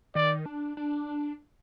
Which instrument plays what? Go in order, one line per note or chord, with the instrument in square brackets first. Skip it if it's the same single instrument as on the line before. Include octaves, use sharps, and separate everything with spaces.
[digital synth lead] D#3 [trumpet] D5
[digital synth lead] D4
D4